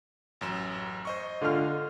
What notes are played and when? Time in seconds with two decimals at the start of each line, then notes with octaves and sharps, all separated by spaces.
0.41 A1 F#2 E7
1.05 C5 D#5 C#6
1.42 D3 F4 F6